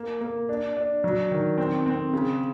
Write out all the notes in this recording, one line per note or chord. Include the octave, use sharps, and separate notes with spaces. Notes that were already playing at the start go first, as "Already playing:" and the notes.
Already playing: A#3
A#3
D4
D4
F#3
D#3
C4
C4
C#3